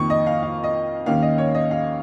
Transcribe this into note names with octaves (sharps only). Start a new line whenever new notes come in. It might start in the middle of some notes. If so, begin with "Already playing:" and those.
Already playing: F2 D#3 A#3 C#6
D#5
F5
F5
D#5
D#2 D#3 A#3 C#4 F5
D#5
C#5
D#5
F5